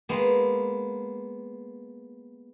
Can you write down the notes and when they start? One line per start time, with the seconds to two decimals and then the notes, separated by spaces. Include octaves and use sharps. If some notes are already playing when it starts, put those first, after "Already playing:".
0.09 G#3 A#3 B3